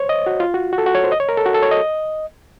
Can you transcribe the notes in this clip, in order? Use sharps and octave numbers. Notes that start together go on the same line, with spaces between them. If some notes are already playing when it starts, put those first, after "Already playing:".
Already playing: C5 C#5
D#5
F#4
F4
F#4
F#4
A4
F#4
C#5
C5
D#5
C#5
A#4
A4
F#4
A4
C#5
D#5